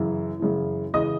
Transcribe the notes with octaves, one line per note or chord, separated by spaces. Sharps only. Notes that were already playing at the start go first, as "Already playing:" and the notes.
Already playing: F#2 C#3 E3
F#2 C#3 E3
C#3 E3 D#5 D#6